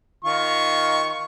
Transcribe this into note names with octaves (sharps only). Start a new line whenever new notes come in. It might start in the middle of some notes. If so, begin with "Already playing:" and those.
D#3 F4 C#6